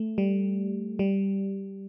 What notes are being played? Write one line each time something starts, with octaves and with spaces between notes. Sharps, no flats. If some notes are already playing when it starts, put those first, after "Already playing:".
Already playing: A3
G3
G3